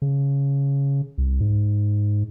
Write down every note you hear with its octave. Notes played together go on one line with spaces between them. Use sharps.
C#3
C2
G#2